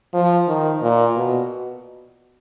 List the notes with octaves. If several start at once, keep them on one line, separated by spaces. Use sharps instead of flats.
F3
D#3
A#2
B2